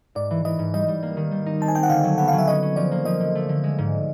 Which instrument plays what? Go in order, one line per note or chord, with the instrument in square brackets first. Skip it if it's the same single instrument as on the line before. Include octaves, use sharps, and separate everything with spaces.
[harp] G#2 [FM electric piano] D5
[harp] E3
[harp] E3 [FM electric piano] D#5
[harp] G#2
[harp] G3 [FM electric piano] D#5
[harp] G3
A#3
D#3
G3
D#4
[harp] C4 [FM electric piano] A5
[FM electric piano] G#5
[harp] C4 [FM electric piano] G5
[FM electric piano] F#5
[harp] D3 [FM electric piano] F5
[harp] F#3
[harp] B3 [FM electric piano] F#5
[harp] F#3 [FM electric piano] F5
[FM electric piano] E5
[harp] C#4 [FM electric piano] D#5
[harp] C#4
[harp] F3 [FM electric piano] D5
[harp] A#3
[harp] F3 [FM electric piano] D#5
[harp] D3
A3
D3
G#3
G#2